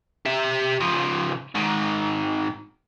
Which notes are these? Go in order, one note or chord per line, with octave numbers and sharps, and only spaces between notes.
G4 E5
C#3 F3
G#2 D#3